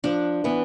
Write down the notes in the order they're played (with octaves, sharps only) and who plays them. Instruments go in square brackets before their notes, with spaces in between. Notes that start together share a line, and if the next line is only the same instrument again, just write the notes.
[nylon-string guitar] F3 [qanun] D4
[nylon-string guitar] E3 [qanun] B3